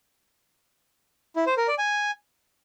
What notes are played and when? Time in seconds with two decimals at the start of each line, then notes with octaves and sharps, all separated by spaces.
1.36 E4
1.47 C5
1.57 A#4
1.68 D5
1.78 G#5